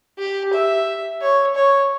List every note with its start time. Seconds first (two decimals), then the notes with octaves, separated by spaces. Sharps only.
0.19 G4
0.53 E5
1.21 C#5
1.55 C#5